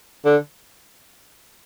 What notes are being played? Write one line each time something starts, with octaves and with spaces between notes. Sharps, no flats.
D3